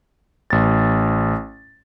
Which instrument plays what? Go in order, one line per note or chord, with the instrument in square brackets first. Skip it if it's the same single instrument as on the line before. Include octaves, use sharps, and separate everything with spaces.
[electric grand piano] A1 A6